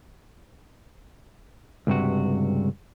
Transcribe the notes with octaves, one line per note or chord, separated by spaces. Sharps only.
C#2 G2 C3 F#4